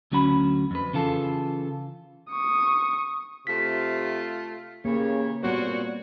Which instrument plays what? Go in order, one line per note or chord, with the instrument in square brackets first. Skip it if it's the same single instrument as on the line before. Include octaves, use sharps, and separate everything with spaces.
[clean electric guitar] D2 F#3 C#4 F#4 B5
F2 B4
C#3 E3 F4 A4
[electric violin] C#6 D#6
[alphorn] C3 [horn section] A3 F4 [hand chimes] B6
[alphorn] C#3 [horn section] E3 G4 C#5 [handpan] A#3
[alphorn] A#2 [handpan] G3 B3 C#5 [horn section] C4 F#4